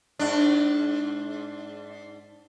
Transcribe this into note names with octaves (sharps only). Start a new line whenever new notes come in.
G#2 D4